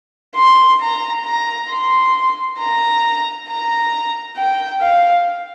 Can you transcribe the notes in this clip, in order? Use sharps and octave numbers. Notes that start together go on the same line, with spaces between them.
C6
A#5
A#5
C6
A#5
A#5
G5
F5